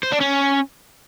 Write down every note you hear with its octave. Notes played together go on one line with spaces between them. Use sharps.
C5
D4
C#4